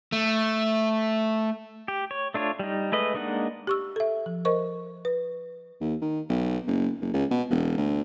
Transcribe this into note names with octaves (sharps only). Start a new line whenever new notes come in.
A3
G4
C#5
A3 D4 F4 C#5
G3 D#4
G#3 A3 B4 D#5
G#3 A#3 D4 D#4 F#5
G4 C#6 E6
A4 E5
F3
A#4 C5 D#5 C#6
B4
D#2
D#3
B1
F#1
F#1
C#2
B2
E1
D2